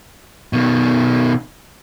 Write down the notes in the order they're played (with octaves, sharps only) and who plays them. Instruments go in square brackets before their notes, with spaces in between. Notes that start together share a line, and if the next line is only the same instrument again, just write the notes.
[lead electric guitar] B2 D#3